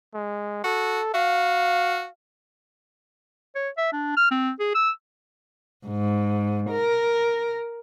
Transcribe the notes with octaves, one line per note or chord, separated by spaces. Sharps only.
G#3
F#4 A4
F#4 F5
C#5
E5
D4
F6
C4
G#4
E6
G#2
A#4